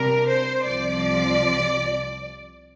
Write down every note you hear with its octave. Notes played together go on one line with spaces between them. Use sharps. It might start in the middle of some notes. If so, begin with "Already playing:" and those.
Already playing: C3 G3 D4 A#4
C5
C2 C3 F3 D5